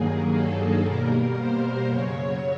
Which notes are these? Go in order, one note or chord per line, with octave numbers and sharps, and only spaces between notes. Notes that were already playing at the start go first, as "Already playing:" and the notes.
Already playing: G2 D#3 F#3 A#3 G#4
A4
B2 G3 A#3 A#4
C5
F#2 C#3 F#3 C#5